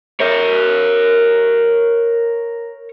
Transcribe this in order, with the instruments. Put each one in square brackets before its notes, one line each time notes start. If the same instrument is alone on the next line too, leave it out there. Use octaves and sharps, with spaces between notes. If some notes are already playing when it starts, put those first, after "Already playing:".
[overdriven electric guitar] A#4 C#5